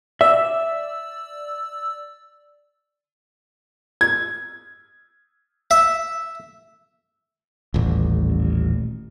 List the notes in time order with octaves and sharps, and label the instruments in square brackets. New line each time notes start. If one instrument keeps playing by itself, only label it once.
[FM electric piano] D5 E6 [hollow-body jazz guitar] E5
[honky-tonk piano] G#6
[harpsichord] E5
[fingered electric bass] D#1 A1